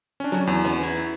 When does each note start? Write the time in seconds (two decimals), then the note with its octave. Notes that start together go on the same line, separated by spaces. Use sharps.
0.20 C#4 D4
0.32 C#3 F#3
0.47 E2
0.65 B3 C#4
0.83 E4